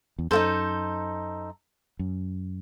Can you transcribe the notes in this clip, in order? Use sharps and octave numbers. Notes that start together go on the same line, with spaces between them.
E2
F#2 D#4 F#4 A4 C5
F#2